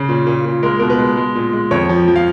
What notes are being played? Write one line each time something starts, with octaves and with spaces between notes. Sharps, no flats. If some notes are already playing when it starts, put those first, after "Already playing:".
Already playing: C#3
A#2
A#2
A#2
G#3 A#4
B2 A#4
B4
G#3
G#3
A#2
G#3
F2 C#5
F3
F3
F5